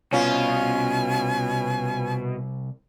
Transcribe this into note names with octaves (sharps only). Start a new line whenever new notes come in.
C2 B2 C#4 F4 G#5